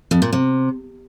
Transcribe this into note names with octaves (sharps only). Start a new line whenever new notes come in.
F2
A#2
C3